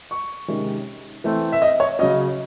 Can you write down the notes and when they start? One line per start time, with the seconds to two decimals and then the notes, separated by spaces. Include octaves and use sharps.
0.11 C#6
0.48 C3 D#3 G#3 C#4
1.24 E3 A3 C4
1.52 E5
1.62 D#5
1.80 C#5
1.99 C#3 F#3 C#4 D#5